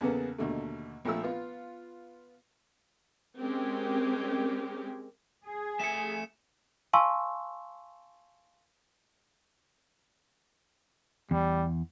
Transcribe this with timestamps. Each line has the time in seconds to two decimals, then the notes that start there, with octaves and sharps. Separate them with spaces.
0.01 E2 C#3 A#3 B3 A4
0.38 D#2 B2 D3 A3
1.05 A#1 F3 A3 E6
1.23 B3 F4
3.39 G#3 C4 C#4 G4 A#4
5.45 G#4
5.80 A3 E5 G#5 C#7 E7
6.93 F5 G#5 A5 C6 C#6 E6
11.31 E2 G3